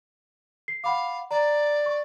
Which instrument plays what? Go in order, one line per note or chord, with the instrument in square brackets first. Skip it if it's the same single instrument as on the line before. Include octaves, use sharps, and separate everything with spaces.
[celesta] C7
[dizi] F5 [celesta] F#5 B5 D6
[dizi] D5 [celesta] A#5
[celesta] C#6